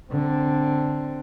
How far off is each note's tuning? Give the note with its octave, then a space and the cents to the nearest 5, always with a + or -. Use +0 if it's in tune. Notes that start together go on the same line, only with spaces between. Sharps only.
D3 +0 C4 +0